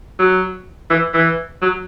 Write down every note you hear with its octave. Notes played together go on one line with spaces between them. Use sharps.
F#3
E3
E3
F#3